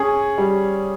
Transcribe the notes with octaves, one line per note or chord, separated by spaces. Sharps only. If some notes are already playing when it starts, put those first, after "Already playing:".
Already playing: C#4 G#4
G3